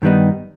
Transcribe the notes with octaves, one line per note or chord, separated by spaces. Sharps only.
G2 D#3 G3 B3 D#4